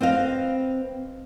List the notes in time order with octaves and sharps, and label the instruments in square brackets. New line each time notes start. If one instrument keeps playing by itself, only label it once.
[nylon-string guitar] C4 B4 D#5 F5